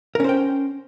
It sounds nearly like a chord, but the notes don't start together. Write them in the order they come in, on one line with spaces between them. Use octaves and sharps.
A#4 C#4 C5 G5